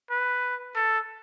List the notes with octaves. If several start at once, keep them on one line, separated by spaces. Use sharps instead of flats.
B4
A4